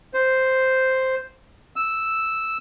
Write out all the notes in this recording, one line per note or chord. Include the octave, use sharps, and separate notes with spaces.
C5
E6